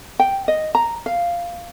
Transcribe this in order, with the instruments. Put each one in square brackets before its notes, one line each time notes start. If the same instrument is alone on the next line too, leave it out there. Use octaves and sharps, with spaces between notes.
[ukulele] G5
D#5
A#5
F5